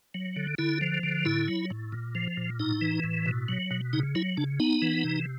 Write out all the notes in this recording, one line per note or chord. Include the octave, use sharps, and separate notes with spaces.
F#3
D3
D3 E4
F3
D3
A2 E4
F#3
A2
A#2
F3
A#2
A2 D#4
E3
A2
B2
F#3
B2
C#3 D#4
F#3 E4
C#3 D4
B3 D#4
E3
C3